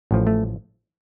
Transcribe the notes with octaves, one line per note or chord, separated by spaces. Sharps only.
A1 A2 F3
A3